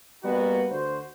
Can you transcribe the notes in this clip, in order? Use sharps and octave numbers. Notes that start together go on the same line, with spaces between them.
G3 A#3 B3 D#4 F#4
D2 F#4 C5